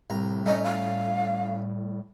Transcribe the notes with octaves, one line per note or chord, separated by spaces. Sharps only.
C2 A2 A#5
G3 A3 C#4 D#5 A#5
F5